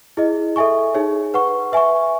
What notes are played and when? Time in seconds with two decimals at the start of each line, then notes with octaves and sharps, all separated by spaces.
0.17 E4 G#4 D#5
0.56 A4 E5 G#5 C#6
0.95 D#4 G#4 C#5
1.34 B4 F#5 C#6
1.72 B4 E5 G#5 C#6